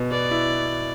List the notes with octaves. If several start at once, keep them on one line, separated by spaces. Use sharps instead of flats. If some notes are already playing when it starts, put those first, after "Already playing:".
Already playing: B2
B3 D5
E4